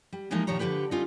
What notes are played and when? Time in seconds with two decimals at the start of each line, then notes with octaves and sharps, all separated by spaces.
0.13 G3
0.31 E3 F3 G#3 A#3 D#4 G#4
0.47 A#2 D#3 F3 G4 C#5 A#5
0.59 D3 F3 F4 G4 B4
0.91 G3 C#4 D#4 F4